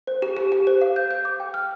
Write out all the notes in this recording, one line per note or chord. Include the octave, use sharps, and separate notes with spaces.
C5
G4
G4
G4
C5
F5
G6
G6
D6
G5
F6